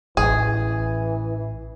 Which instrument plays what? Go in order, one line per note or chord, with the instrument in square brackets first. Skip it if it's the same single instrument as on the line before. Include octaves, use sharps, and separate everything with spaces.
[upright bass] A1 [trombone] E3 [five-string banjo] G#4